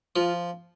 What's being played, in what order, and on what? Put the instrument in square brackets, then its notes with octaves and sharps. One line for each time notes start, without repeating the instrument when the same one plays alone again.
[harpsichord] F3 [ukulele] F4